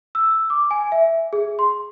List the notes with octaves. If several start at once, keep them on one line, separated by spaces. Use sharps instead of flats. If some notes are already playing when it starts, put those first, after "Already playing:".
E6
D6
G#5
E5
G#4
C6